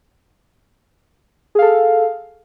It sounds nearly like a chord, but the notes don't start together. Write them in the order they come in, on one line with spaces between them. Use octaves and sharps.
G#4 F5 A4